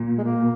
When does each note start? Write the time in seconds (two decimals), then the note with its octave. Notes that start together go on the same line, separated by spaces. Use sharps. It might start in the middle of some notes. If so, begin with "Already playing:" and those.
Already playing: A#2
0.18 G#3
0.24 A#3